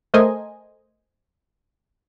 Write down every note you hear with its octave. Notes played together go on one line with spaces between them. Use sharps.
A3 A#4 C5 D#5 G#5